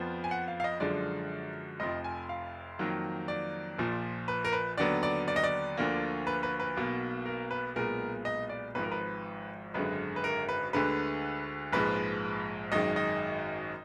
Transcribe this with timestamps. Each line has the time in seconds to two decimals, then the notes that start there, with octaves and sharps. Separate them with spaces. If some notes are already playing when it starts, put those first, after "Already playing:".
Already playing: F2 F3 B3
0.24 G#5
0.31 F#5
0.48 F5
0.60 F5
0.64 D#5
0.80 F#2 D3 F3 G#3 D5
1.80 F1 F2 F3 D#5
2.04 G#5
2.29 F5
2.79 F2 D#3 F#3 A#3
3.28 D5
3.78 A#1 A#2 F3
4.28 B4
4.45 A#4
4.53 B4
4.78 D#2 D3 F#3 B3 D5
5.03 D5
5.28 D5
5.36 D#5
5.44 D5
5.78 D2 D3 F3 A#3
6.27 B4
6.43 B4
6.60 B4
6.77 B1 B2 A#3
7.26 A#4
7.51 B4
7.75 B1 A#2 G#3 B3 A#4
8.25 D#5
8.49 D5
8.75 G#1 G#2 F3 B4
8.83 A#4
8.92 B4
9.74 G#1 F#2 D3 G#3 B4
10.16 B4
10.24 A#4
10.49 B4
10.73 D2 D3 G#3 B4
11.73 A#1 G#2 F3 G#3 B4
12.72 G#1 F#2 D#3 G#3 D#5
12.96 D#5